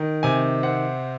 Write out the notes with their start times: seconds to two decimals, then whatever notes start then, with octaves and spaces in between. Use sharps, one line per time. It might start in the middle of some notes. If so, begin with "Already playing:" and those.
Already playing: D#3
0.23 C3 G#5
0.63 C4 F#5